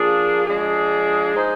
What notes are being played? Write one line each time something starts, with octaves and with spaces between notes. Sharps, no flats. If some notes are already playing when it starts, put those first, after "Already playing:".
Already playing: F3 A#3 D4 G#4
F3 G#3 D4 G#4
G#3 D#4 G#4 C5